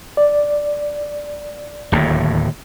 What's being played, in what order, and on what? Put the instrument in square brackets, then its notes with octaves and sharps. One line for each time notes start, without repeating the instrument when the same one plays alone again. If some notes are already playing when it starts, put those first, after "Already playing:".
[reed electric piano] D5
[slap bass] D1 D#2 A2